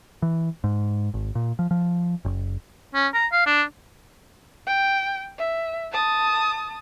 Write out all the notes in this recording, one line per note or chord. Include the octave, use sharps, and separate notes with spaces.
E3
G#2
G#1
A#2
F3
F3
F#1
C#4
A#5
F5
D4
G5
E5
A5 D#6